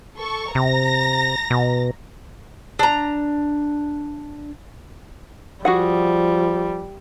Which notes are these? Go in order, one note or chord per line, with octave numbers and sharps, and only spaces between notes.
A4 C#6
C3 A#5 A#6
B2
D4 A#5
F3 G3 F#4 G#4 F#5